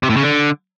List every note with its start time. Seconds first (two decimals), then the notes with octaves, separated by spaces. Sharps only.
0.03 C3
0.10 A2
0.16 C#3
0.23 D3